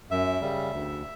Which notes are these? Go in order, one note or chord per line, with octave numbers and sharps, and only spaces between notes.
F#2 E5
C#3 G3
D2